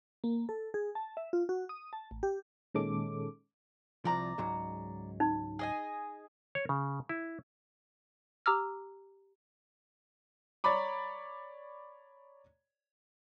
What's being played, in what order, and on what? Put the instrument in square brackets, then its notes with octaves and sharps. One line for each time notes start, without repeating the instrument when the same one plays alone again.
[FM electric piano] A#3
A4
G#4
A5
E5
F4
F#4
D#6
A5
A1
G4
A#2 D#3 G#3 C#4 A4 D6
[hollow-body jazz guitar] C2 F3 [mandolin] D5 A#5
[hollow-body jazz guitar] C#2 G#2 F#3
[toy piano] D#4
[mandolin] G#4 D#5 G#5
[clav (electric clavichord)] C#5
C#3
E4
[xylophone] G4 A#5 D6 E6 F6
[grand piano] C#5 D5 A#5 B5 D6